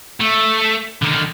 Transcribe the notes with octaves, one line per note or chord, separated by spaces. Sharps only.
A3
D3 D#3